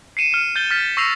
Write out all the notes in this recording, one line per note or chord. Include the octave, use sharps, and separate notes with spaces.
C7 C#7 D#7 E7
F6 C#7 E7
G6 A6 D#7 G7
F6 A6 B6 G7
C#6 E6 A#6 C7 C#7 F7